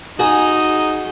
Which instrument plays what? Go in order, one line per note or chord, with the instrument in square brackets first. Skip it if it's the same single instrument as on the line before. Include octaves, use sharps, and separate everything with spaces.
[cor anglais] D#4 [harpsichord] F#4 G#4